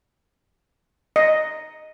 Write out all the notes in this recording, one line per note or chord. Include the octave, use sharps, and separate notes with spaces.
D#5